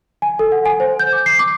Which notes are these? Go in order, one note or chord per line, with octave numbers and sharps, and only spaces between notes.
G#5
A4
F#5
G#5
C5
G6
D6
C7
D6